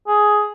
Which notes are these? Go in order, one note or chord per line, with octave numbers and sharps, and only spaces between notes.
G#4